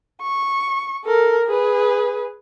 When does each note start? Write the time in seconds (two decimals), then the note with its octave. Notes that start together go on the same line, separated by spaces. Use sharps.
0.22 C#6
1.05 A4 A#4
1.47 G#4 B4